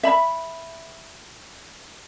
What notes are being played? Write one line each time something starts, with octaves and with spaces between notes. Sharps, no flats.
E5 B5